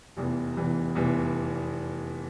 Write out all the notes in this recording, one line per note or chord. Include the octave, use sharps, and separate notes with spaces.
F1 E2 E3
F1 E2 E3
F1 E2 E3